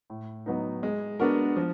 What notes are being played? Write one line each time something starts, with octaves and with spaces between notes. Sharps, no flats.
A2
F#3 B3 D#4
G#3
B3 D4 F#4 A#4
F3